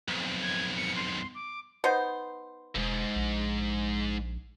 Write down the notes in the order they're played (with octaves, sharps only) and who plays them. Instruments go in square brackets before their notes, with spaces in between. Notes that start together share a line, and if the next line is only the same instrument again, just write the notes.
[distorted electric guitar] B1 F2
[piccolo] G#6
C#7
C6
D6
[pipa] B3 D#4 C5
[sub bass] E1 [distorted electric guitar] C#2 G#2
[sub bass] A#1